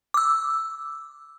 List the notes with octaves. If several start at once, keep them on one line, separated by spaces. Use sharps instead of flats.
D6 E6